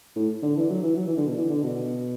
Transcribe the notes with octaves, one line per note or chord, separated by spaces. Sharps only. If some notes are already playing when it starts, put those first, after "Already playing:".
A2
D3
E3
F#3
E3
F#3
E3
D3
B2
E3
D3
B2